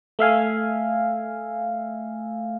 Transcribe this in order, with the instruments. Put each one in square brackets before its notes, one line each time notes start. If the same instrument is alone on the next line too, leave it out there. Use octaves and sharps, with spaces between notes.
[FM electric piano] A3 E5 F5 G#5